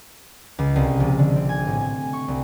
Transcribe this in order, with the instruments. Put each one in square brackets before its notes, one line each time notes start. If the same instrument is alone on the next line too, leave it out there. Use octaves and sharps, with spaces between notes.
[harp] C#2
C2
A#1
D3
C4
G#5
A2
G#5
C#6
C2